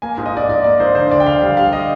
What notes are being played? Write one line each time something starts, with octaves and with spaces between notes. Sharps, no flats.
A#3 G#5
G#2
D#5
G#2 D5
G#2 D5
A#3 D5
G#2 C5
D3 C5
D2 D5
G5
D2 F5
G3 F5
G3 F5
D#5